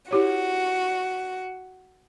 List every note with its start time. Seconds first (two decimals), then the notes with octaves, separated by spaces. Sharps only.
0.11 E4 F#4 G4 C#5